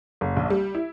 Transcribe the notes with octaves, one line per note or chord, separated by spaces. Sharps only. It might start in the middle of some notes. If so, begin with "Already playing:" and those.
F#1
A#1
G3
E4